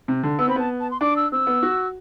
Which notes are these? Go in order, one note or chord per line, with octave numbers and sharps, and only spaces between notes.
C3
D3
B3 E6
C4 B5
B3 A5
A5
C6
D4 D6
E6
C4 E6
B3
F#4